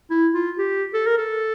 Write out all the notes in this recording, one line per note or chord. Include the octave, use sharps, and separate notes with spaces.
E4
F4
G4
A4
A#4
A4